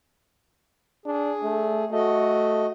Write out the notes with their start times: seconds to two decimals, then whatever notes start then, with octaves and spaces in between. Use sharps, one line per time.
1.06 D4 G#4
1.43 A3
1.92 A3 F#4 D#5